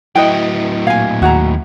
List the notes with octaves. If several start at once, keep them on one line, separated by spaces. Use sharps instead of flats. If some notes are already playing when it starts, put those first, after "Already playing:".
A2 F#3 E4 B4 D#5 G5
A#2 F5 G#5 G#6
D#2 F#4 G#4 A#5